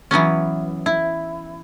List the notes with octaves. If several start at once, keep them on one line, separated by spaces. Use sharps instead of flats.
E3 F#3 B3 C#4
E4